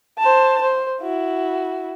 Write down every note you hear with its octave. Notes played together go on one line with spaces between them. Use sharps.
C5 A5
C5
E4 F#4